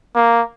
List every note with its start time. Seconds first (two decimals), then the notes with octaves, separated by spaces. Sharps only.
0.16 A#3